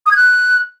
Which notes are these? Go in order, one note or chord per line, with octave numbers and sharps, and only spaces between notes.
D#6
G#6
F#6